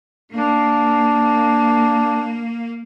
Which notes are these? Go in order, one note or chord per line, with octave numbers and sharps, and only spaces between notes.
A#3 D4